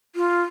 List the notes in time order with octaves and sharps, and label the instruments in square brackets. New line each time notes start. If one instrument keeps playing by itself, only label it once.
[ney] F4